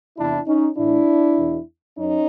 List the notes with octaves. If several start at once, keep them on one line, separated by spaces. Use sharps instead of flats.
E2 C3 E3 D4 E4
C#4 D#4
A2 E3 D4 E4
E2 B2
F#2 C#4 D#4